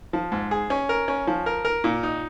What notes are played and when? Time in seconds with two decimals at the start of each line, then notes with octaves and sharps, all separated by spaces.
0.13 F3
0.32 G#2
0.51 G#4
0.70 C#4
0.89 A#4
1.08 C#4
1.27 F3
1.46 A#4
1.65 A#4
1.84 A#2
2.03 D#4